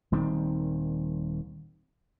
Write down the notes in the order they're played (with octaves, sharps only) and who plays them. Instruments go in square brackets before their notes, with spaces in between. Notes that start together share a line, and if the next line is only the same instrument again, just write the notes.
[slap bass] D#1 D#3 G3 C4